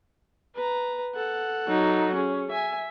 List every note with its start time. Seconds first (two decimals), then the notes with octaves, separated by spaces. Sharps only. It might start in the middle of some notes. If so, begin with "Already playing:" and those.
0.55 B4 A#5
1.15 A4 F#5
1.68 F#3 D#4
2.15 C#4 G#4
2.52 E5 G#5